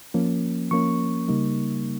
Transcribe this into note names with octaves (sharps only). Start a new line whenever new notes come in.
F3 A#3 C#4
F3 A#3 C#4 C#6
C#3 G3 A#3 D#4